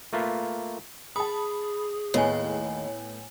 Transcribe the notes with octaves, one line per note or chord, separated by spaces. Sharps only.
A3 A#3 F4 B4
G#4 A5 B5 D#6
D#2 A2 B3 C#5 G#5